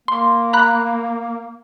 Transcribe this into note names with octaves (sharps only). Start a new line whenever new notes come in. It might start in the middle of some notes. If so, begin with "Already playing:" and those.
A#3 C6
A#5 B5 F#6